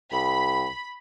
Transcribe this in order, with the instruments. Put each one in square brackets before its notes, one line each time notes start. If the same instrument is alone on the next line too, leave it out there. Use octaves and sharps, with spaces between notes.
[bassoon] C2 [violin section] B5